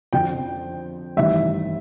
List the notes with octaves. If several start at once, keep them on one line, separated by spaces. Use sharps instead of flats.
F2 D3 F3 G5
A1 G2 D#3 E5